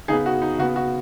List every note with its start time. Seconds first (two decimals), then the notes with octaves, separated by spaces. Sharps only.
0.08 C#3 B3 D#4 G#4
0.26 F#4
0.42 D#4
0.59 C#3 B3 F#4
0.76 F#4